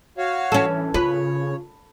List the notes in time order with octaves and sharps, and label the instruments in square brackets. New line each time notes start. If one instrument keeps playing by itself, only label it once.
[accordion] F#4 C#5 F5
[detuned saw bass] E3 [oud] C#4 A4
[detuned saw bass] C#3 [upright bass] F4 [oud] B4 [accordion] C#5